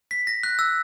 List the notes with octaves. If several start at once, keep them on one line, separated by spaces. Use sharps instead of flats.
B6
A#6
F#6
E6